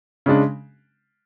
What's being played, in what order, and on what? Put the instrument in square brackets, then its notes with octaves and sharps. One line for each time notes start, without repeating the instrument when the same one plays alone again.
[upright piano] C#3 G#3 D4